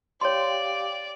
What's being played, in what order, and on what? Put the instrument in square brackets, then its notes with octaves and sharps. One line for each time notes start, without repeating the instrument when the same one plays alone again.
[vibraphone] G4 F5 G5 [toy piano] C#5 C6 [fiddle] D5